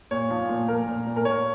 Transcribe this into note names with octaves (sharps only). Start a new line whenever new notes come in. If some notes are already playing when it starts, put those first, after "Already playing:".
A#2 C#5
F3
A#2
A#2 A#4
A#2
A#2
A#4
A#2 C#5